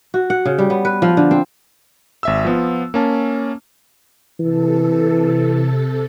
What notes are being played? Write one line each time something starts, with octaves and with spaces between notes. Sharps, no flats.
F#4
F#5
C#3
G3
B3
B4
F3
D3
C4
G#1 E5 E6
F3 B3 F4
A#3 C#4 A5
C3 E3 A4